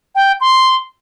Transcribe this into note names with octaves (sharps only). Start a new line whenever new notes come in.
G5
C6